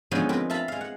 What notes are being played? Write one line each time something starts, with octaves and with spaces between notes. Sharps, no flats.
D3 F3 G#3 B3 C#4 D#4
C4 A#4 B4
E5 F5 A5 B5
G#3 F5
F#5